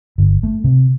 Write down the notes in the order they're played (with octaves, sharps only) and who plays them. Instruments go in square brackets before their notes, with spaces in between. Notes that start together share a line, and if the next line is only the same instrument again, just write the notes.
[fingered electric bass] G1
A3
C3